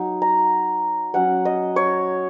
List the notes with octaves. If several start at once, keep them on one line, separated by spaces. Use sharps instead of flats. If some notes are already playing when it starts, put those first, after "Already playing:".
Already playing: F#3 D#4
A#5
F#3 C#4 F#5
D#5
C#5